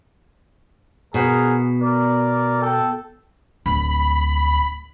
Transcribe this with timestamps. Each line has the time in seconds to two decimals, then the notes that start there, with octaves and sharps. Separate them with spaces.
1.14 B2 G#4 A#4 F#5
1.81 A#4 D5
2.62 A4 G5 A5
3.66 D1 B5